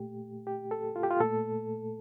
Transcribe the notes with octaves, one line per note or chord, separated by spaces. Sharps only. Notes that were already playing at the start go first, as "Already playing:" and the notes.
Already playing: A#2 A3 G4
G4
A4
F4
G4
F4
A#2 A3 A4